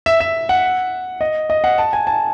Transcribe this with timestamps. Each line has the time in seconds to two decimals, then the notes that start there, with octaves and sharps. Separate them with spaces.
0.06 E5
0.20 E5
0.49 F#5
1.21 D#5
1.50 D#5
1.64 F#5
1.78 A5
1.93 G#5
2.07 A5